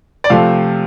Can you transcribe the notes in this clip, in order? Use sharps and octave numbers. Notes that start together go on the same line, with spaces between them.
D5
C3 F3 A3 F5